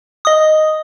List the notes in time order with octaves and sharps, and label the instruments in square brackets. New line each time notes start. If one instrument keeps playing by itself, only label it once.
[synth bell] D#5 D#6